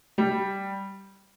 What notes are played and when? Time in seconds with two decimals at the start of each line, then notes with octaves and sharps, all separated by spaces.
0.18 G3